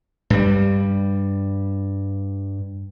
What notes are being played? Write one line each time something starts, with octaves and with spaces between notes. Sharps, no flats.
G2 G3